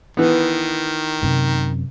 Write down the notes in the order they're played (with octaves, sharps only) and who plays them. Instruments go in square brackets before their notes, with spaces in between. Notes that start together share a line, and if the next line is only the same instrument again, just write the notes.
[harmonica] D#3 [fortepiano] E3 B3
[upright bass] F#2 C3